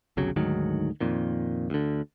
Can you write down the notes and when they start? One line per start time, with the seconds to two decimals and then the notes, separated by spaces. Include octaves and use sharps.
0.17 G1 C2 C#3 F#3
0.36 D2 G#2 D#3 F#3
1.00 F2 A#2 D#3
1.70 D2 D3